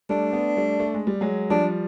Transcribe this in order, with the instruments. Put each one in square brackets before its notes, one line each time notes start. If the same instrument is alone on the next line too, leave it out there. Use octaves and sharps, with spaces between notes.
[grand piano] G3 A3 [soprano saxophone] D4
[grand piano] A3 B3
G3 A3
A3
G#3
G3
F#3 G#3
[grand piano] F3 G3 [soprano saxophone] D4